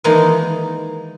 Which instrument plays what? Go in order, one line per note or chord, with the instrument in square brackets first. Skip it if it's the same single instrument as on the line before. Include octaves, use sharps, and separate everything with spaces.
[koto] D#3 E3 G#3 A#3 D4 D#4